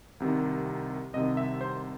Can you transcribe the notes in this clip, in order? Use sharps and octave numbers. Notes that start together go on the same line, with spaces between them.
C2 C3 D#3
C2 C3 D#3 D#5
E5
C5